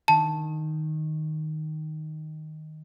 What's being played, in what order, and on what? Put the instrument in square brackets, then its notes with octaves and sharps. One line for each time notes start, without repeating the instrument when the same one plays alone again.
[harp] D#3 [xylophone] A5